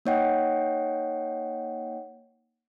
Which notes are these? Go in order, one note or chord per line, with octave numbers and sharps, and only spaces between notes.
A#3 D#4 C#5 D#5 F#5 G5